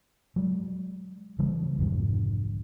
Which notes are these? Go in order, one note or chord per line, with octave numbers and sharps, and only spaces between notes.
F#3 G#3
C#3 E3 G3 A#3
C2 F2 G#2 D3